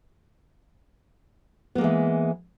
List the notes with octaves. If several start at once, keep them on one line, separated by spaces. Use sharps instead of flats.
E3 G#3 A#3 B3